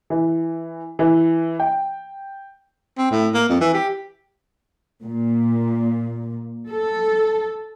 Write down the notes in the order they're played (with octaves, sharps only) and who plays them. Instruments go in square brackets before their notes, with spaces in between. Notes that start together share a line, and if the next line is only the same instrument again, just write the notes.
[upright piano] E3
E3
G5
[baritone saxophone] C4
A2
A#3
F2
E3
G4
[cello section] A#2
A4